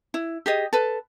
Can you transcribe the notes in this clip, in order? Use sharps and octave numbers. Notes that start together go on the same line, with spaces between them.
E4
G4 G#4 D#5
A4 B4